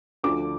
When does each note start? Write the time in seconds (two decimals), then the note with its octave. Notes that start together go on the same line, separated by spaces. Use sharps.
0.24 D2 D3 F3 D6